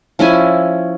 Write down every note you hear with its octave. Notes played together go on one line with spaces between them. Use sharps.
F3 C#4 E4 G#5